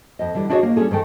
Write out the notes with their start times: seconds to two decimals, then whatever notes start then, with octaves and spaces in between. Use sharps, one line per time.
0.19 F2 D#5
0.34 D3 E3 G3
0.50 D4 E4 F#4 G#4 C#5 D#5
0.63 A#3
0.76 G3 C#4 D#4 F4 G#4 A4
0.91 G#2 D#3 A3 G5